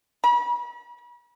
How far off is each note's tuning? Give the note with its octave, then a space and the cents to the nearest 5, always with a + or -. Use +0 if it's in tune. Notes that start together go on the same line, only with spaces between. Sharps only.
B5 -40